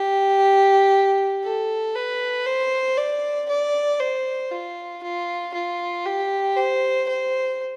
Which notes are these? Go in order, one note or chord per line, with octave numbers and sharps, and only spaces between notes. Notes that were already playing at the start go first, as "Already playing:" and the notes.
Already playing: G4
A4
B4
C5
D5
D5
C5
F4
F4
F4
G4
C5
C5